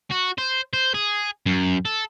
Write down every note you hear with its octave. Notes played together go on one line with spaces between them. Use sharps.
F#4
C5
C5
G#4
F#2
A4